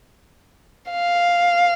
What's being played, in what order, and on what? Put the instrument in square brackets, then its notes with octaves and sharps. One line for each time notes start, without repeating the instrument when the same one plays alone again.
[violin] F5